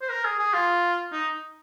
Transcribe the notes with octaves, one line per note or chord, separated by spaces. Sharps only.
C5
A#4
G#4
G#4
F4
D#4